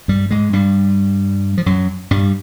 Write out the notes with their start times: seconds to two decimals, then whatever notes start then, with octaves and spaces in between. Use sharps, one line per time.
0.08 G2 G3
0.31 G#2 G#3
0.53 G2 G3
1.58 F3
1.66 F#2 F#3
2.11 G2 G3